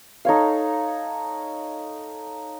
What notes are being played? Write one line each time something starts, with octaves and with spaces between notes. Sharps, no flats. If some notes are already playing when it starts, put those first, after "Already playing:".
D#4 A4 C#5 F5